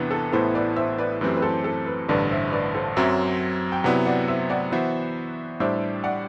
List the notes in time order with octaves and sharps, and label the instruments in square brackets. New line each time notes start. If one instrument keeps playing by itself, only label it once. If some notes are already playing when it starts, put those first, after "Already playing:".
Already playing: [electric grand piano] E2 C3 E3 B3 D4 [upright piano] B4
[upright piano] A4
[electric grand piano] A1 A2 E3 B3 E4 [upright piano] A4 C5
[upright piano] B4 D5
C5 E5
B4 D5
[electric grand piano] F#2 E3 A3 C4 G4 [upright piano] B4
[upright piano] B4
A4 C5
A4
B4
[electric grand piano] A1 G2 D3 [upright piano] B4 D5
[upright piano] C5 E5
B4 D5
A4 C5
[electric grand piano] F#2 F#3 C4 [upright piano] C5 E5
[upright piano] G5
[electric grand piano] C3 F#3 B3 E4 [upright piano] D5 F#5
[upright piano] D5 F#5
C5 E5
D5 F#5
[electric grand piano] E3 B3 F#4 C5 E5
[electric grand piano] A2 G3 D4 G4 D5 [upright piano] C5 E5
[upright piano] D5 F#5